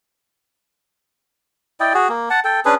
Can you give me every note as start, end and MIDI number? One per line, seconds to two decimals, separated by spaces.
1.80 1.93 64
1.80 1.93 74
1.80 1.93 75
1.80 1.93 79
1.94 2.08 66
1.94 2.08 68
2.09 2.29 58
2.30 2.40 78
2.30 2.40 81
2.44 2.60 69
2.44 2.60 79
2.65 2.75 61
2.65 2.75 62
2.65 2.75 68
2.65 2.75 71